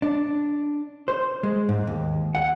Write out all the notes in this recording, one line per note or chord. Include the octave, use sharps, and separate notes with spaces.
D4
C5
G#3
G#2
D#2
F#5